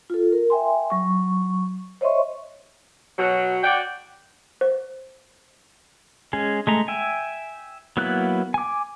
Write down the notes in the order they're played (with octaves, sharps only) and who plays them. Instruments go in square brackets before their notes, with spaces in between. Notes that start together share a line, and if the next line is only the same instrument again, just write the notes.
[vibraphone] F4 A4
A#4
E5 G5 G#5 C6
F#3 C#6
C5 C#5 D#5 E5 C6 C#6
[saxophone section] B2 F#3
[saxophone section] F#4 D5 [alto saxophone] G5
[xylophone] C5
[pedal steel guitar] G#3 C#4 G#4
G#3 A3 A#5
E5 G5 G#5
F#3 A#3 B3 E4 F#6
G#5 D6